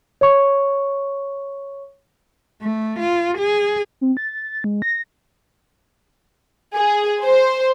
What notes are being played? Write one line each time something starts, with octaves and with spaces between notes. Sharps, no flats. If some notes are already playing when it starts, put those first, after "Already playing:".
C#5 C#6
A3
F4
G#4
C4
A6
G#3
A#6
G#4
C5